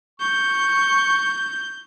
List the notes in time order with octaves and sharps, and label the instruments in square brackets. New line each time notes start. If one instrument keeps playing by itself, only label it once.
[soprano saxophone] C#6 [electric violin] G6